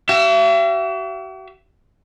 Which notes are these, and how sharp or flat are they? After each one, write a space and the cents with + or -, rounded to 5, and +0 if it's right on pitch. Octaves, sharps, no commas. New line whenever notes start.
F#4 +45 E5 +40